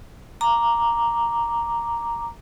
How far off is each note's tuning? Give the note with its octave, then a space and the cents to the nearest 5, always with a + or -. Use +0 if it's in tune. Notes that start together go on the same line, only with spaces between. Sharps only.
A#5 +0 D6 +0